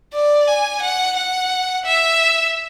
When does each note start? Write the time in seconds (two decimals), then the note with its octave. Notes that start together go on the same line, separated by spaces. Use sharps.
0.14 D5
0.48 G#5
0.82 F#5
1.17 F#5
1.85 E5